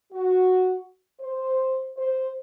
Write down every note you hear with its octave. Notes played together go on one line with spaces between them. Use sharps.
F#4
C5
C5